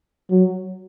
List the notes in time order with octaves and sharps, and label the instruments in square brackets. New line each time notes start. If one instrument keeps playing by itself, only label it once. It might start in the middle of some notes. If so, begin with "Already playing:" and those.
[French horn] F#3